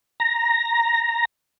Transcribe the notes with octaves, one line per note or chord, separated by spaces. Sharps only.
A#5